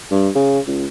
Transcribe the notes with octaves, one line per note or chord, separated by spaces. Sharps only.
G2
C#3
C#2